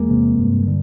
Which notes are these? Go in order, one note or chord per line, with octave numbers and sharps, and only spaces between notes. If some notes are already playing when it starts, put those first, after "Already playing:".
Already playing: E2 G#3 A#3
C3
G2
D3